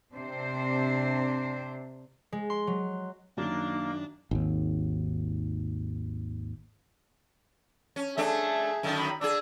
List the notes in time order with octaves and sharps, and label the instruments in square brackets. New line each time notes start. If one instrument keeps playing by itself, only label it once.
[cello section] C3 C4 D4 C5
[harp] G#3
C6
F#3
[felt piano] F#2 D#3 [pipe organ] A#3 [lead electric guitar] D4
[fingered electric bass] G#1 D#2
[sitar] C#4
[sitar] A3 D4 [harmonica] G#4 E5 A5
[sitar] F#2 D3 D#3
[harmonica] B5
[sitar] D4 G#4 [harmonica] D5 E6